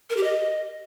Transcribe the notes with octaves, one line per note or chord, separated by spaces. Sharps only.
A#4
G4
D#5